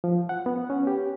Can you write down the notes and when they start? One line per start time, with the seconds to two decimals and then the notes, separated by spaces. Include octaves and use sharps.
0.04 F3
0.29 F#5
0.46 B3
0.70 C#4
0.87 G4